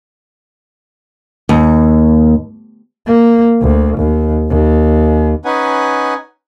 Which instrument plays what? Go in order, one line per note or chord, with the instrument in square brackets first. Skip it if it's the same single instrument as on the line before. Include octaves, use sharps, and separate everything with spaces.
[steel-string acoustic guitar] D#2
[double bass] A#3
D2
D#2
D#2
[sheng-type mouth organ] C#4 D#4 B4 F#5 G#5